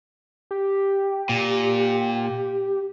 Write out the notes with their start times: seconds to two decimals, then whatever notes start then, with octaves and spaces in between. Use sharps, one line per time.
0.51 G4
1.29 A#2